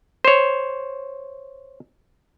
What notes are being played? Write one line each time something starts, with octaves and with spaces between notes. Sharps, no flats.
C5 C#5